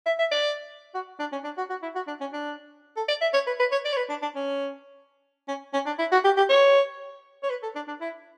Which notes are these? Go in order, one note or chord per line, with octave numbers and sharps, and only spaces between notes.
E5
E5
D5
F#4
D4
C#4
D4
F#4
F#4
E4
F#4
D4
C#4
D4
A4
D5
E5
C#5
B4
B4
C#5
D5
C#5
B4
D4
D4
C#4
C#4
C#4
D4
E4
F#4
G4
G4
C#5
C#5
B4
A4
D4
D4
E4